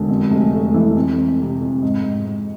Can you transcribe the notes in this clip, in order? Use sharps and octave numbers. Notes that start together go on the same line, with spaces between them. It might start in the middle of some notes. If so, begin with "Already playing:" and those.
Already playing: E1 D3
F2
F1
A3
E3
F2
F2
C3
F2
G#2
G#2
G#2